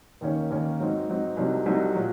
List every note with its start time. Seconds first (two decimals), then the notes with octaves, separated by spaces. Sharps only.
0.21 D#2 D#3 A#3 C#4
0.50 D#2 D#3 A#3 C#4
0.79 G#2 F#3 C4 D#4
1.08 G#2 F#3 C4 D#4
1.37 C2 C3 F#3 C4 D#4
1.66 C2 C3 F#3 C4 D#4
1.95 A#2 F#3